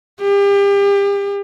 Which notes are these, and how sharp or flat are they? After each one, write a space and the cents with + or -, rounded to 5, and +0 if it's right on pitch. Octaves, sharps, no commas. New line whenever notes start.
G4 +35